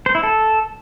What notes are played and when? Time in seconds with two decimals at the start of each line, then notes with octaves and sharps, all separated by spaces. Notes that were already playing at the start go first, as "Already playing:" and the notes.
0.06 C5
0.15 E4
0.23 A4